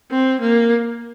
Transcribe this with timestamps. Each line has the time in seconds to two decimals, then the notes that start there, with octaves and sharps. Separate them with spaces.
0.11 C4
0.40 A#3